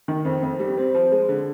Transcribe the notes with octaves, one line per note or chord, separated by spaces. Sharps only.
D#3
F2
F2
G3
C4
F3
G#3
D3